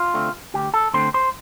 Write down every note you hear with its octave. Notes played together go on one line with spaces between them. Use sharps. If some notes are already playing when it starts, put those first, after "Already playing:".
Already playing: F4
D3 A3 C4
D2 G4
A4
D3 A3 C4 C5
C5